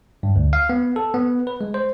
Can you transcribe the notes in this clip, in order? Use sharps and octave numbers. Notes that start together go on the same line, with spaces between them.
G2
D2
F5
B3
A4
B3
B4
G#3
C5